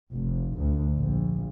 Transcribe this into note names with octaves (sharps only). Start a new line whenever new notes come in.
F1
D2
A#1